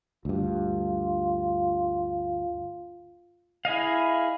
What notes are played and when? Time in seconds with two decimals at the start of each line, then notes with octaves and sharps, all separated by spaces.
0.25 D2 G2 F4
3.65 E4 G#4 D#5 F5